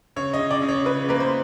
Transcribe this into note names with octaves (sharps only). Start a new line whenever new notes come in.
C#3 C#5
D#5
C#3
D5
C#3
C#5
C#3 B4
A#3 B4
C5